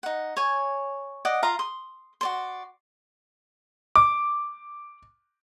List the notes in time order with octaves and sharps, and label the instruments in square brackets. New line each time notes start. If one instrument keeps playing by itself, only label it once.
[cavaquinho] D#4 F#5
C#5 G#5
D5 D#5 F#5 D#6
F4 F5 A#5
C6 D#6
F#4 D5 C6
[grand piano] D6